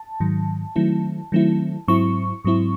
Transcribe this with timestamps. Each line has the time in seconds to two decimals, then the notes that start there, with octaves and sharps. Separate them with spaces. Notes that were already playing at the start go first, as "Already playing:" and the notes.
Already playing: A5
0.20 G#2 D#3 F#3
0.76 D#3 F#3 A3 C4 E4
1.32 D#3 F#3 A3 C4 E4
1.88 G#2 F#3 C4 E4 C#6
2.45 G#2 F#3 C4 E4